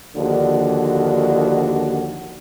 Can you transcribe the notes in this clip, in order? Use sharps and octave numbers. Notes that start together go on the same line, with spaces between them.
D#2 D3 F3 D4 F#4